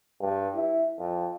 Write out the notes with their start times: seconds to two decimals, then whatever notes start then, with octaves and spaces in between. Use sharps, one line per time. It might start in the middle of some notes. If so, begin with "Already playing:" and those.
0.21 G2
0.55 E4
0.99 F2